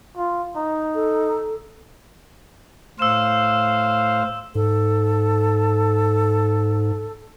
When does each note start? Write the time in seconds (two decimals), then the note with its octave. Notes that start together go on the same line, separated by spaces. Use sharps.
0.17 F4
0.56 D#4
0.95 A4
2.99 A2 C5 F5 E6 E7
4.55 G#2 A4